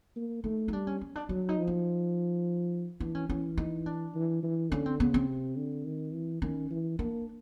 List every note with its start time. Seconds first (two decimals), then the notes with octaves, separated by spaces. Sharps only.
0.16 A#3
0.44 A3 D#4
0.68 D#4
0.73 G3 D4
0.87 C#4
1.01 C#4
1.16 D4
1.29 F#3 D4
1.49 D#4
1.58 F3
1.67 D#4
3.00 E3 D4
3.15 C#4
3.29 E3 C#4
3.57 D#4
3.86 D4
4.15 E3
4.43 E3
4.71 D3 C#4
4.86 C4
5.00 C#3 B3
5.14 C4
5.29 C3
5.57 D3
5.85 D#3
6.14 E3
6.42 D#3 C#4
6.71 E3
6.99 A#3 D4